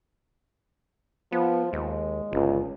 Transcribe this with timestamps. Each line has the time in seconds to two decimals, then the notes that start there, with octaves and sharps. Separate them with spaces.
1.32 F3 B3
1.73 D#2 G#3
2.33 G1 C#2